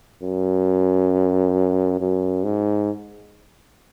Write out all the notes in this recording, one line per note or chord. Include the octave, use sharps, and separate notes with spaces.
F#2
F#2
G#2